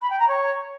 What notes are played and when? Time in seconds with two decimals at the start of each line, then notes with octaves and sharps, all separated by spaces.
0.01 B5
0.10 G5
0.18 A#5
0.27 C#5